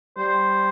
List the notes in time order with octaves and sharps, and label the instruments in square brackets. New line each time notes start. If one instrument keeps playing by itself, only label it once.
[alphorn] G3 [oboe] C5